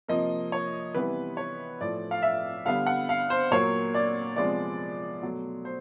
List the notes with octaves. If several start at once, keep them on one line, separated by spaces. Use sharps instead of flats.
C3 F3 A#3 D#5
C#5
C3 E3 G3 B3 B4
C#5
A2 F3 A3 D5
F5
E5
D3 G3 B3 F5
F#5
F5
C5
A#2 F#3 A#3 C#5
D5
C3 F3 G#3 B3 D5
B2 F#3 A3
C5